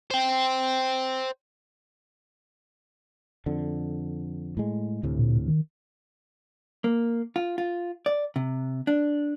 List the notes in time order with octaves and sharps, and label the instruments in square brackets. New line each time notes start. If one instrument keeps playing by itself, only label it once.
[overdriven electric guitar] C5 G5
[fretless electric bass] F2 D3
A2 G#3
D2 A2 C3
[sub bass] A#2
D#3
[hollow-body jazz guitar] A#3
F4
F4
D5
C3
D4